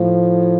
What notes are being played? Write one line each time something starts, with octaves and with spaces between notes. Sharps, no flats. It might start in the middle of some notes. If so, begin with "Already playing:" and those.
Already playing: A2 F3